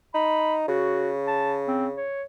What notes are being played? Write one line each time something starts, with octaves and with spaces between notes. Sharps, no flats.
D#4 B5
C#3 F#4
A5
C4
C#5